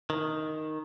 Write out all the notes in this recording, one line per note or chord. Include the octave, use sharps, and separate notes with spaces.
D#3